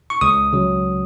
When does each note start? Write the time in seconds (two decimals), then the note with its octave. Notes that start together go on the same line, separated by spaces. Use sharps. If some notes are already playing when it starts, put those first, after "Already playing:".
0.10 C#6
0.21 C#2 D#6
0.53 C#3 F#3